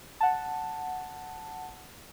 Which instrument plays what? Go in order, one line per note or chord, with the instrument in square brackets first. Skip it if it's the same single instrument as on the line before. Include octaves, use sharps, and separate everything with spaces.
[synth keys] F#5 A5